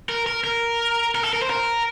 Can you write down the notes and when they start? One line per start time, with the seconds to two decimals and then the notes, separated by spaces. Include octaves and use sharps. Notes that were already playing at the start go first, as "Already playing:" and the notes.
0.09 A#4
0.26 A#4
0.44 A#4
1.15 A#4
1.24 A4
1.33 A#4
1.42 C5
1.50 A#4